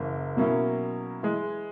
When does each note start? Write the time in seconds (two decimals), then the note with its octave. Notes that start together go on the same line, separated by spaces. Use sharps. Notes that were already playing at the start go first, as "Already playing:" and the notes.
Already playing: F#1 F#2 E3 A#3
0.37 B2 F#3 A#3 C#4 E4
1.23 E3 G#3